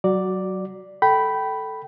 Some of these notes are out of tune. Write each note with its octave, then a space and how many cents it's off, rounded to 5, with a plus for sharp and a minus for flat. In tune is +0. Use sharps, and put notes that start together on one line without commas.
F#3 +25 F#4 +0 D5 +0
A4 +0 G5 -20 B5 +0